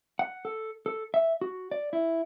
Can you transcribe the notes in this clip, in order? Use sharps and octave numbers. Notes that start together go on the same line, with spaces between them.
F#5
A4
A4
E5
F#4
D5
E4